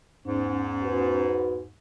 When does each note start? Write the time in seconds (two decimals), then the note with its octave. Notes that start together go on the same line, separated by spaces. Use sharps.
0.25 E2 G#2 C#4
0.83 F#4 B4